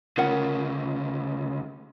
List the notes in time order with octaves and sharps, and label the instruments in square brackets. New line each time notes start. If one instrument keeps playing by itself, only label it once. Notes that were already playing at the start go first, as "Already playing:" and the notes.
[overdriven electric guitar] D2 C#3 [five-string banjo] F4 A#4 F#5